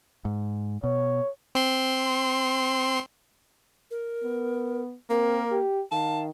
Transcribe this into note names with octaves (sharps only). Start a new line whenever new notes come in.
G#2
B2 C#5
C4 C6
A#4
B3
A#3 C4 A#4
G4
D#3 F5 A5